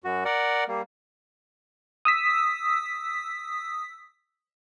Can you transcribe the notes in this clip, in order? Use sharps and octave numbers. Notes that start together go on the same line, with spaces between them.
F#2 F#4
A#4 D5 F#5
G3 A#3
D#6 E6 B6